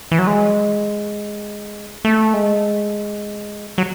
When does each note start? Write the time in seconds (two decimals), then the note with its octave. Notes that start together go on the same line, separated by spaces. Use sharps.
0.11 E3
0.19 F#3
0.27 G#3
2.05 A3
2.34 G#3
3.78 F#3